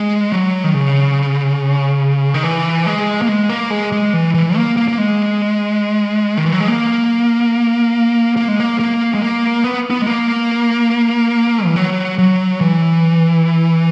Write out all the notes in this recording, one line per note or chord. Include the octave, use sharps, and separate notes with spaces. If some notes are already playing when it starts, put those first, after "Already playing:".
Already playing: G#3
F#3
D#3
C#3
D#3
E3
G#3
A#3
G#3
A#3
G#3
G#3
E3
E3
A#3
A#3
A#3
G#3
D#3
E3
F#3
G#3
A#3
A#3
G#3
A#3
A#3
G#3
A#3
B3
B3
G#3
A#3
E3
F#3
F#3
E3